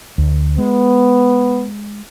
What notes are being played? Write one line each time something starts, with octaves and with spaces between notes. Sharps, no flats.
D2
G#3 B3